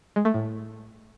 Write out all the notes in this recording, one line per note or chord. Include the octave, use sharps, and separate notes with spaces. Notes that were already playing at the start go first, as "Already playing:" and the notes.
G#3
A3
A2